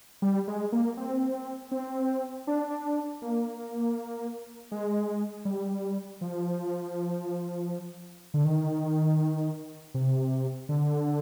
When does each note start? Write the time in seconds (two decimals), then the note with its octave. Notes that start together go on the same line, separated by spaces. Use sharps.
0.22 G3
0.48 G#3
0.72 A#3
0.97 C4
1.72 C4
2.47 D4
3.22 A#3
4.71 G#3
5.45 G3
6.21 F3
8.34 D3
8.45 D#3
9.94 C3
10.69 D3